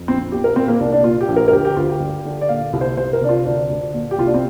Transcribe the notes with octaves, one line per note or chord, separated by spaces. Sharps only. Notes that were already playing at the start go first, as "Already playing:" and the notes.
Already playing: F2
A#1 C4
A#2 G4
A#4
A#2 C4
A#3
C2 D4
D4
A#2 F4
G4
A#1
A#4
A#4
D2 G4
G4
D2 F4
G4
G2
D3
D5
A#2 F5
C2
C5
C2 C5
A#4
C3 D4
F4
D2 D4
D2
A#2
G4
C2 F4
D4
C4